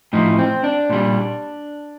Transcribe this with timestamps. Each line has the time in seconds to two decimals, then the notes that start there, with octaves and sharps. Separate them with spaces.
0.13 A2 F3 D#4
0.39 C4
0.64 D4
0.90 A#2 G3